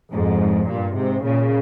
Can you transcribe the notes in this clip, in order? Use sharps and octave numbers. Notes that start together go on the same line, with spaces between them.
F2 G#2
G2 A#2
G#2 C3
A#2 C#3